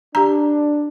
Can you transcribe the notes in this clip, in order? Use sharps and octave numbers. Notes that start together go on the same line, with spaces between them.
D4 G4 A#5